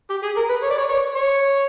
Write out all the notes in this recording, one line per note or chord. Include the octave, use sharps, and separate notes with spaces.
G4
G#4
A#4
B4
C#5
D5
C#5
C#5
C#5